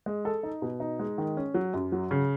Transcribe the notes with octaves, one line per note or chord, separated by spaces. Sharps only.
G#3
A4
D#4
B2
D#4
G#3
D#3
C#4
F#3
F#2
F#3
C#3